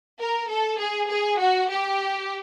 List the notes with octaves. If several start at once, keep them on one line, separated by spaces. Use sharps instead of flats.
A#4
A4
G#4
G#4
F#4
G4